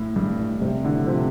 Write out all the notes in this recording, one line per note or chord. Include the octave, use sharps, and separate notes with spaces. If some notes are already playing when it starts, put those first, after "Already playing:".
Already playing: A2
G2
A2
G2 C3
A2 D3
C3 F3